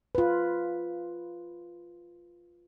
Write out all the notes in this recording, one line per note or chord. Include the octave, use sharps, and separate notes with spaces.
F4 B4